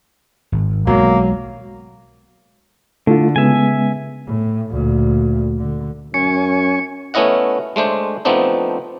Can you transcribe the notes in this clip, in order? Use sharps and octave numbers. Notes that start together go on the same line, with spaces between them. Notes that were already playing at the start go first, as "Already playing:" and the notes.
G#1
B1 B2 F#3 G#3 A#3
D3 A3 E4 F4
C#3 G#3 B3 E5 G#5
A2
D2 A#2
D3
F#2 C#4 G#5 C#6 C#7
A3 B3 C#4 E4 D#5 F#5
G#3 A3 D4 C5
F3 A3 B3 C4 D4 D#4